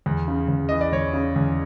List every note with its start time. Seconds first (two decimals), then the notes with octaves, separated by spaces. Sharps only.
0.06 E2
0.28 C#3
0.48 E2
0.69 E3 D#5
0.81 D5
0.92 E2 C#5
1.13 C#3
1.36 E2